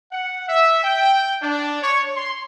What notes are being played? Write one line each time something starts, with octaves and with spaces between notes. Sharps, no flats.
F#5
E5
G5
D4
C#5
C6